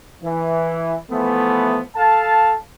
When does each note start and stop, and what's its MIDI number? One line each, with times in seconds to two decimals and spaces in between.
0.24 0.96 52
1.11 1.80 52
1.11 1.80 53
1.11 1.80 57
1.11 1.80 59
1.96 2.54 69
1.96 2.54 77
1.96 2.54 81